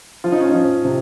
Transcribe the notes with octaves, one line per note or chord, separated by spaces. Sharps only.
F3 F4
D#4
C#4
F3 D#4
C3